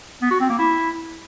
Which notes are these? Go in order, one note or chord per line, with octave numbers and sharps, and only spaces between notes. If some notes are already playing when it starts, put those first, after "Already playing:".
B3
F#4
C4
A#3
E4